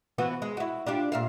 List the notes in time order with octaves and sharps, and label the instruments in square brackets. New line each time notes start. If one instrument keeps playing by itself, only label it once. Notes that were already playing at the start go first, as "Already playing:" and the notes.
[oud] E3 B3 F#4
G#3
E4 F#4
D4 F4 G4
A#2 E5 F5